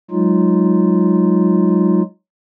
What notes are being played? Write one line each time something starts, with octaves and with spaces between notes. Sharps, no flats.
F#3 G#3 D#4 F4